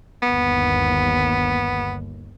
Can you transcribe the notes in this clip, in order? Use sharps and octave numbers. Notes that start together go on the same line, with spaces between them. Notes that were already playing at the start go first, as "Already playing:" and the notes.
G1 D#2 B3